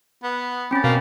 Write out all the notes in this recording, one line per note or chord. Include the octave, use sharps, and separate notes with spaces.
B3
C4 C#4 B5 A6
B2 A#3